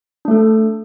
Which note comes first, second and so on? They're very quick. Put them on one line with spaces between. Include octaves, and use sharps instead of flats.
D4 A3 A4